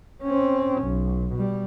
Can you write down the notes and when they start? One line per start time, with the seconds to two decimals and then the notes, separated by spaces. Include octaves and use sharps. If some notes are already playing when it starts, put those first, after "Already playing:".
0.23 C4 C#4
0.82 B1
1.34 B2 G3